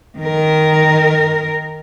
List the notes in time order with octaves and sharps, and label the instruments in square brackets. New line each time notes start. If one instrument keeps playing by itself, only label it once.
[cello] D#3 A#4